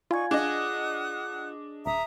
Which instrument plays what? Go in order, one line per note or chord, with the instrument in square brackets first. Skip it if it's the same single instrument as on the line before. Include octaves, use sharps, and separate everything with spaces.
[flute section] D#4 D5 C#6 [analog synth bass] F4 [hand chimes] F5 G#5 G#6
[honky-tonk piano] D4 D#5 [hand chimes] G#4 [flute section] F#5 D#6 F#6
[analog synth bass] D#1 [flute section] E5 A#5 D#6